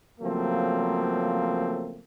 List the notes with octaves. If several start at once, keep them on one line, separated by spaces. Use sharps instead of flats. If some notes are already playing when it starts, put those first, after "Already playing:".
C#3 F3 F#3 A3 A#3 C4